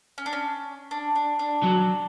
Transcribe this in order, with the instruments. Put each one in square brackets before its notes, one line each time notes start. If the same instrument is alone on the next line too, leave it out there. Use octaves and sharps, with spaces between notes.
[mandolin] C#4
D4
C#4
D4
D4
D4
[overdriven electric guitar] F#3